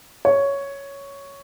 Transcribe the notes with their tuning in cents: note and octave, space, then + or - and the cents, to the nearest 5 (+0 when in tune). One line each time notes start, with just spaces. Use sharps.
C#5 +5